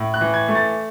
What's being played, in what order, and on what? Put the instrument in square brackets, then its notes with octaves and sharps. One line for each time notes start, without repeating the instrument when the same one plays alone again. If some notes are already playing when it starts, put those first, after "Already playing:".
Already playing: [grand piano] A2
F#6
E3
G#6
A3
A6